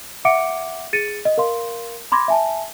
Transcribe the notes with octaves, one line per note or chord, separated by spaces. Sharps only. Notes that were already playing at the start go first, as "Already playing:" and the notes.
E5 F#5 D6 C#7 D7
G#4 A6 C#7 D#7
D#5
A#4 F5 C6
B5 C6 D6 G#6 A#6
E5 G#5 A5